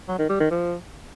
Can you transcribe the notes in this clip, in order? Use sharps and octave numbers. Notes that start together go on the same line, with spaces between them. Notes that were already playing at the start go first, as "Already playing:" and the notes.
F#3
D#3
G3
D#3
F3